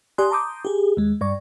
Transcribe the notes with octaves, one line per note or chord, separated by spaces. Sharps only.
G4 D5 G#5 C6 D#6 F#6
A5 A#5 C6 D6 D#6 G6
G4 G#4
D#2 G#3
G2 D5 C#6